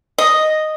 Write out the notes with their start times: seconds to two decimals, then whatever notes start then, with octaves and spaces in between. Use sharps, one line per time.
0.18 D#5